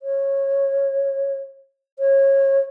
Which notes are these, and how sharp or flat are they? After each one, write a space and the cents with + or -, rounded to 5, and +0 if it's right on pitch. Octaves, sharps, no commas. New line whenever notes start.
C#5 -15
C#5 -25